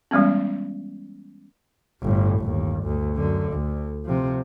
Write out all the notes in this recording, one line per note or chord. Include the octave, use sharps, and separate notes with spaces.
E3 G3 G#3 B3 C#4
G1 A2
G1 D#2
D2
F#2 D3
D2
C3 F3